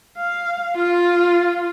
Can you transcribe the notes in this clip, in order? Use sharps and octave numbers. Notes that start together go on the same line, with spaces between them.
F5
F4